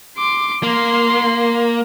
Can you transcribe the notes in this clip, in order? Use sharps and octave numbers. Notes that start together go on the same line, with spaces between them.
C6 D6
A#3 C6